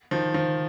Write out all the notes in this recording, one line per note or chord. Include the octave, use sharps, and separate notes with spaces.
D#3 F3
D#3 F3